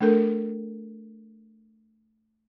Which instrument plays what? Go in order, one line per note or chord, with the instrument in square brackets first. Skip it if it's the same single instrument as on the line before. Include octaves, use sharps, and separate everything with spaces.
[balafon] A3 D4 A4 A#4